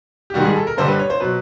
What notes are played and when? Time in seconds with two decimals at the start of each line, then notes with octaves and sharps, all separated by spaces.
0.30 G4
0.34 G#2 D#3 G3 F#4
0.45 G#4
0.56 A4
0.67 A#4
0.77 G2 D3 G3 C5
0.88 B4
0.99 C#5
1.10 C5
1.20 B2 F#3 B4